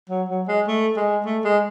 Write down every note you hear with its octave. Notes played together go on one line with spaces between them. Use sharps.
F#3
F#3
G#3
A3
G#3
A3
G#3